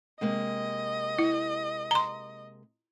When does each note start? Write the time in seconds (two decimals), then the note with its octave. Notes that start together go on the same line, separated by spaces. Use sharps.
0.21 C3 G#3 A#3 D#5
1.19 E4
1.91 A#5 C6